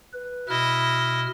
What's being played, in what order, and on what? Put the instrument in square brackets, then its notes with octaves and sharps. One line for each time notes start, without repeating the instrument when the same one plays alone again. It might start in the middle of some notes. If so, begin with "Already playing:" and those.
[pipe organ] B4
[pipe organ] B2 F6 [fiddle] E4 D#5